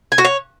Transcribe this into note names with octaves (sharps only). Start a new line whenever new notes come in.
G#5
F#4
C#5